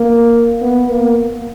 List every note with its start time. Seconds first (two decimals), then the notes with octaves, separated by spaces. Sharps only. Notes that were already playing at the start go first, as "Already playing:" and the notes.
Already playing: A#3
0.61 B3
0.90 A#3